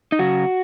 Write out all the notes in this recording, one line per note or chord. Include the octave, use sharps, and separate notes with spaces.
D#4
C#3 F#3 F#4